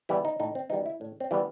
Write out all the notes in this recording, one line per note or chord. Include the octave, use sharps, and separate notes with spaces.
E3 G3 B3 E4
D#4
A2 D#4
C4
E3 G3 B3 D#4
F#4
E4
A2
C4
E3 G3 B3